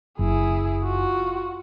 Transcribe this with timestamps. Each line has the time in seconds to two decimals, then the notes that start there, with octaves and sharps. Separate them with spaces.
0.19 F#1 E4 G#4
0.83 F4 F#4